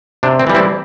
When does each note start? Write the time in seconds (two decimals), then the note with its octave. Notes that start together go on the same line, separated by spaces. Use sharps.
0.23 C3 D4
0.39 C4
0.47 E3 G3
0.55 C4 E4